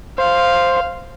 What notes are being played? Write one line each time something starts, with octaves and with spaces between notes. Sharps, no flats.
C5 F5